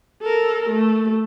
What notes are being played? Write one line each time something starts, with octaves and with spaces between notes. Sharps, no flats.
A4 A#4
A3